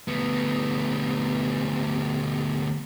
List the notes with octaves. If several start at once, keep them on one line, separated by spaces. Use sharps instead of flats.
D2 B3